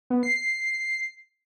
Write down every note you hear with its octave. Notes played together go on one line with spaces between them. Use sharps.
B3
C7